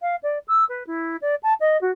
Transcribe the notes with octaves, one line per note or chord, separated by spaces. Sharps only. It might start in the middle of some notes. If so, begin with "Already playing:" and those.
F5
D5
E6
B4
E4
D5
A5
D#5
F#4